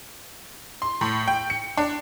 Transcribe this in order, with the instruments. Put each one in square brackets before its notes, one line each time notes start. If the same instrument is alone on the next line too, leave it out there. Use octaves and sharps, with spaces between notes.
[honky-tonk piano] C6
A2
G5
C#7
D4